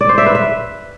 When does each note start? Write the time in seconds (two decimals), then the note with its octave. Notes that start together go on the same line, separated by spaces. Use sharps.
0.01 D5
0.09 C5
0.18 E5
0.26 B4
0.35 E5